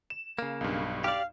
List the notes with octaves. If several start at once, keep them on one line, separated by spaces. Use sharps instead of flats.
E7
C#3 A#3
B1 G2
G4 D5 F5